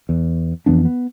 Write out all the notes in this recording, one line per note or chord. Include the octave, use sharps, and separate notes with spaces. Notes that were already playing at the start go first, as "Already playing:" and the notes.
E2
F2 E3 B3 D4
B3